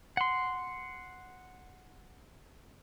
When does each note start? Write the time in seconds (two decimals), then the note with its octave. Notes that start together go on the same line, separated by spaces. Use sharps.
0.17 F#5 C6